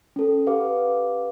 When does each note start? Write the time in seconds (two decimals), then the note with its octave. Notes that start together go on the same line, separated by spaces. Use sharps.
0.16 C#4 A4
0.47 G4 B4 F5 F#5 D6